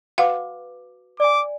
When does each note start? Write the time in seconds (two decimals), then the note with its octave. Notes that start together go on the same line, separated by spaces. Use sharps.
0.18 F#4 B4 F5 F#5 D6
1.20 D5 G#5 D6